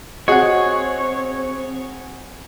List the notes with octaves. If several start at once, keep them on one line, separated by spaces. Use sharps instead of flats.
C4 F#4 G#4 C#5 D#5 F#5